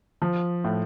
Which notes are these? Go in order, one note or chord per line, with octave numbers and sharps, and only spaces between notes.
F3
A2